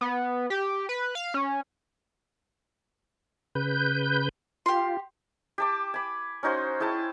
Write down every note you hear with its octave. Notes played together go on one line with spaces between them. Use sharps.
B3
G4
B4
F5
C#4
C#3 B4 G6
F4 G4 C6
G4 A5 D6
G#5 B5
C#4 D#4 F#4 C5
E4 G#4 G5 A5